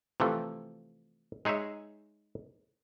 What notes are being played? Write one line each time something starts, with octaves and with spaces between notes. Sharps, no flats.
C3 E3 F3 A3
G#3 D#4 G#4 C#5 E5